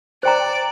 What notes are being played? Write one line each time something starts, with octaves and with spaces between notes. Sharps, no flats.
C5 D5 G5 A#5